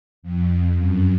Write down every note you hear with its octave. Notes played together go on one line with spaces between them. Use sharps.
F2
F#2